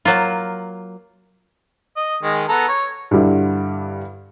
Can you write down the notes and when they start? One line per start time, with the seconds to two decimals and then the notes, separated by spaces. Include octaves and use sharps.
0.05 F#3 A#3 F4
1.97 D#5
2.23 D#3 G#3
2.49 B3 A4 A#5
2.69 C#5
3.11 G2 D3 G3 E4